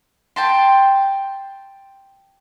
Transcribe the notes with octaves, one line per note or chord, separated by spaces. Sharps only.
G5 A5 C6